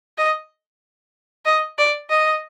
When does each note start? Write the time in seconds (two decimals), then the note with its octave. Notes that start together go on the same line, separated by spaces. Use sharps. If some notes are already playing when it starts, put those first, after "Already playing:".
0.18 D#5
1.45 D#5
1.78 D5
2.10 D#5